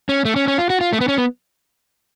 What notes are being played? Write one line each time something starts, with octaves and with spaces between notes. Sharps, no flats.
C#4
A3
C#4
C#4
F4
F#4
F4
A3
B3
C#4
B3